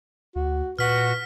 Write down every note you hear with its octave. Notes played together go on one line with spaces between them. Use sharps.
D2 F#4
A#2 F#4 B4 F6 B6